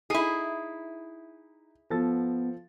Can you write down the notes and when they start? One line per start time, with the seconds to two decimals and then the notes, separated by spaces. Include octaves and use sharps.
0.10 D#4 E4 G#4 C7
1.90 F3 B3 A4 A6